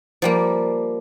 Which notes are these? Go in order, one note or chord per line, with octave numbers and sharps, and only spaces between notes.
F3 G3 A#3